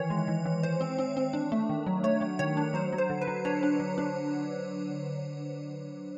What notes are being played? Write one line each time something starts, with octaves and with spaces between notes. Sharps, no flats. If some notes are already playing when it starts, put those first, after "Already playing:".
Already playing: D#3 E3 C#5
G#3
E3
E3
E3 C5
C4
C4
C4
D4
A3
D#3
F#3
A3 C#5
A3
D#3 C#5
D4
F#3 C5
F#3
C5
D3
B4
F#3
D4 C#5
D4
F#3
D4